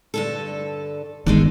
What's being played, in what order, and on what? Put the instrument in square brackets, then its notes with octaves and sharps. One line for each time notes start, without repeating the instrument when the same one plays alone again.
[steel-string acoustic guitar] G2 D3 A4
[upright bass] G1 D#3 [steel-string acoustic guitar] G#3 A3 D4